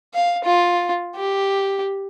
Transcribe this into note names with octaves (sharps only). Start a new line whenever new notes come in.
F5
F4
G4